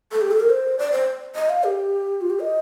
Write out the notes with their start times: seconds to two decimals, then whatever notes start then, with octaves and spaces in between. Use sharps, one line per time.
0.12 A4
0.21 G4
0.31 A4
0.40 A#4
0.50 C5
0.79 D5
0.92 C5
1.35 D#5
1.49 F5
1.64 G4
2.21 F4
2.30 G4
2.40 D#5